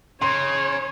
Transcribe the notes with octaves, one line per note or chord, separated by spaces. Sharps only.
C#3 C#5 C6